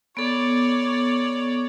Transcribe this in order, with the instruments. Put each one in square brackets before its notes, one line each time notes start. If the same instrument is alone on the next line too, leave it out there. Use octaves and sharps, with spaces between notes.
[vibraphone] B3 A4 [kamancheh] C#5 D5